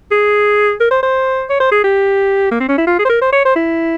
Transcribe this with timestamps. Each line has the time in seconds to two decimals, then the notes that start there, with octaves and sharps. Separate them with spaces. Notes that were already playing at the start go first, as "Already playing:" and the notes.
0.11 G#4
0.80 A#4
0.91 C5
1.03 C5
1.49 C#5
1.60 C5
1.72 G#4
1.84 G4
2.51 A#3
2.60 C4
2.68 C#4
2.78 E4
2.87 F4
2.99 G#4
3.05 C5
3.10 A#4
3.22 C5
3.33 C#5
3.45 C5
3.56 E4